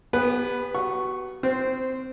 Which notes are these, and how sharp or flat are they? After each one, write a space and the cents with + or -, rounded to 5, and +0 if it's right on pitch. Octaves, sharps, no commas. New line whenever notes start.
B3 +0 G4 +40 B4 +0
F#4 +30 C#6 -5
C4 -15 C5 +0